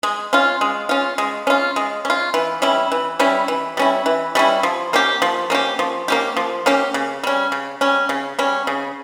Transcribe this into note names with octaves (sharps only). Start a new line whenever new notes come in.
G#3
C#4 F4
G#3
C#4 F4
G#3
C#4 F4
G#3
C#4 F4
E3
G3 C#4 E4
E3
G3 C#4 E4
E3
G3 C#4 E4
E3
G3 C#4 E4
F3
A#3 C#4 G4
F3
A#3 C#4 G4
F3
A#3 C#4 G4
F3
A#3 C#4 G4
C#3
G3 C#4
C#3
G3 C#4
C#3
G3 C#4
C#3